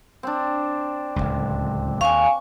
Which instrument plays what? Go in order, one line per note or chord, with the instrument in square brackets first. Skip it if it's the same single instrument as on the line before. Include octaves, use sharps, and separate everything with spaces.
[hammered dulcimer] C4 D4
[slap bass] D1 G1 C#2
[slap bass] D#2 [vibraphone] F5 G#5 [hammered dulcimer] C#6